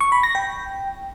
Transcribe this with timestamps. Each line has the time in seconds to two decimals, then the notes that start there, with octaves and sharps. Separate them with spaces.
0.01 C#6
0.12 B5
0.23 A#6
0.35 G5